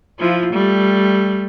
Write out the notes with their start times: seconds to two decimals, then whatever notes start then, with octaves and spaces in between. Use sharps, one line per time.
0.18 F3 E4 F4
0.53 G3 A3